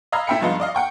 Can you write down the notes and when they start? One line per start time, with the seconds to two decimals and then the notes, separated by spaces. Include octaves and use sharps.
0.12 D#5 F5 A#5 B5 E6 G#6
0.27 A2 C4 E5 G5 B5 C#7
0.41 G2 F3 G#3 B3 D#4 F4
0.60 D5 D#5 F5
0.75 F#5 G5 C#6